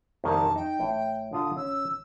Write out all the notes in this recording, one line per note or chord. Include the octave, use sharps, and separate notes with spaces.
C2 F2 D#3 A#3 A5
D#4 G5
A1 A2
D3 F4 D#6
C#4 E6